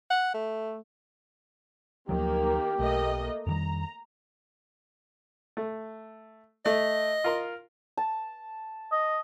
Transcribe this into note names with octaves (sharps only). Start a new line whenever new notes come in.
F#5
A3
D2 D#3 F3 F#3 A#3 G4
B1 A3 A#3 D#5
F2 D#3 G3 A#5
A3
A3 D#5
F4 A#4 C6
A5
D#5